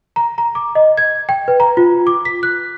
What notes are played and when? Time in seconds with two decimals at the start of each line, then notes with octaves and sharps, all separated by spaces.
0.16 A#5
0.38 A#5
0.55 D6
0.75 D#5
0.97 G#6
1.29 G5
1.48 B4
1.60 A#5
1.77 F4
2.07 D6
2.25 B6
2.43 F#6